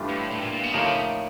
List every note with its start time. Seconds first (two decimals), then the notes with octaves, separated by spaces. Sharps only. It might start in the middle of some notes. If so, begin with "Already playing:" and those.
Already playing: G2 E3 A3 D4 F4
0.09 A2
0.31 A2
0.41 A#2
0.52 A#2
0.63 B2
0.74 A2 C#3 F3 A#3 D#4